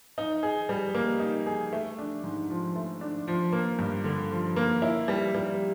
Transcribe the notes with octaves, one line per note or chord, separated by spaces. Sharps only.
D#4
G#4
G3
A#3
D#4
G#4
A3
D4
G#2
F3
A3
D4
F3
A#3
G2
D3
F3
A#3
E4
G3
G3